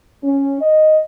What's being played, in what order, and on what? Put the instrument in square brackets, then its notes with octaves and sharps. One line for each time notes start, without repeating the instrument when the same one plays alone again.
[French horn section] C#4
D#5